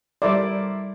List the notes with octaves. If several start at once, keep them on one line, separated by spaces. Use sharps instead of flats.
G3 E4 A4 A#4 C5 D5